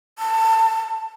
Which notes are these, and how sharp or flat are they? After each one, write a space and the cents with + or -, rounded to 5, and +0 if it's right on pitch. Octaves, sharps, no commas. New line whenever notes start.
A5 +25